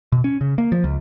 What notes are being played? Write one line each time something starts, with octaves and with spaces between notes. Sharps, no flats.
B2
C#4
C#3
A#3
F3
C#2